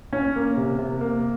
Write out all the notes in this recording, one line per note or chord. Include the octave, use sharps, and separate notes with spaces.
C#4
A#3
C3
C3
A#3